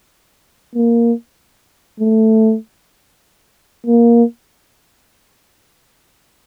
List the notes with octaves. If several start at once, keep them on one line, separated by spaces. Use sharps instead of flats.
A#3
A3
A#3